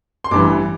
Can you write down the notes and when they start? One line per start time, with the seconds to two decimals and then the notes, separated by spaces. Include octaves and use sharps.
0.24 C6
0.31 A1 G2 E3 D6